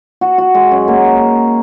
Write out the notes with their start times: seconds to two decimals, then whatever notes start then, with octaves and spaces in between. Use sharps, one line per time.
0.21 F#4
0.38 F#4
0.55 G#3
0.71 F#2
0.88 A#3